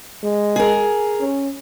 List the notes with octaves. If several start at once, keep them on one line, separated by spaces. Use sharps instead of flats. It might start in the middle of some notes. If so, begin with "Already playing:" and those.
G#3
G#4 A#4
C#4